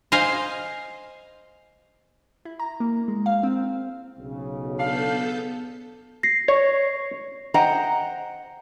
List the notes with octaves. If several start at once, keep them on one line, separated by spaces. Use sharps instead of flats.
C5 D#5 F5 G#5
E4
A#5
A#3
G#3
F5
C4
B1 C#3
B3 D4 A4 F5 G6
A#6 C7
C#5
C5 D#5 F#5 G5 A#5